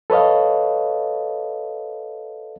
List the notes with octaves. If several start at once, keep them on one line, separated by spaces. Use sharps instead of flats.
A4 B4 C#5 D#5 F5